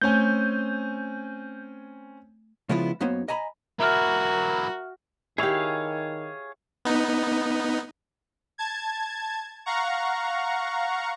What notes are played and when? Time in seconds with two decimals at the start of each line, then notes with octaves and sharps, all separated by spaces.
0.02 A3 C4 C#4 G#5 G6
2.69 C#3 F3 G#3 B3 E4 F4
3.00 F#2 A#3 B3 D#4 C5 C#5
3.28 D#5 G#5 A#5 B5
3.80 F#3 E4 F#4 A#4 E5 F6
5.38 D#3 E4 G4 G#4 C#5 F5
6.85 B3 D#4
8.58 A5 G#6
9.66 F5 F#5 A#5 C#6